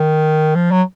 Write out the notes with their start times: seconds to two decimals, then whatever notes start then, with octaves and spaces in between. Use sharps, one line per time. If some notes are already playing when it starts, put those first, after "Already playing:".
Already playing: D#3
0.55 F3
0.71 F#3